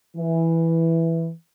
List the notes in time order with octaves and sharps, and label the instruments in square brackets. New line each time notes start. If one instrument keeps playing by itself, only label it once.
[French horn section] E3